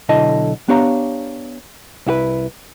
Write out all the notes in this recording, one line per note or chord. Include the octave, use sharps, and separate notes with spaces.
B1 D3 E4 D#5 A5
B3 D4 G4 C#5 F5 A#5
C2 E4 F#4 B4